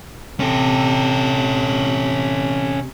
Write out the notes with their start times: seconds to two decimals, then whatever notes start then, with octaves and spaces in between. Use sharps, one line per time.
0.40 C3 C#4 A4